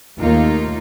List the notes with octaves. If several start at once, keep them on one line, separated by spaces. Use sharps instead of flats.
D#2 A3 A#3 D#4 F4